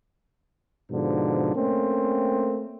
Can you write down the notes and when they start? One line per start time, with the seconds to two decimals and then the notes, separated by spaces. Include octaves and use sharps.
0.91 G#2 B2 D3 F3
1.56 A3 A#3 C4 C#4